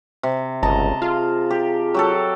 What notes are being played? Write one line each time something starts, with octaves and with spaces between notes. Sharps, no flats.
C3
G1 C#2 D#5 A5 A#5
F4 G#4 F5
G4
F#3 G4 A4